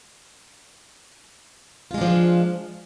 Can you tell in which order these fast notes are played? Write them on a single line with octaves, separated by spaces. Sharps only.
F4 G#3 D4 F3